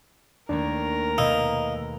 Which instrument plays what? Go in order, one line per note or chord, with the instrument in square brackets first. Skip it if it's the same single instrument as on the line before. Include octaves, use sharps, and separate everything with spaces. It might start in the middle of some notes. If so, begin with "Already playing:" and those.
[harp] D#2 A3 A#3 [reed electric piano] D4 [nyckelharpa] A#4
[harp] B2 [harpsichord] D#4 [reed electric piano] F5 A#5 E6